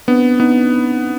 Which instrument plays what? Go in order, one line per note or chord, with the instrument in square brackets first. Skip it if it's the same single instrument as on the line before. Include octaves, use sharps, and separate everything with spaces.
[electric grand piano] B3 [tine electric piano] C4 D4
[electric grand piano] B3 [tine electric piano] C#4 D#4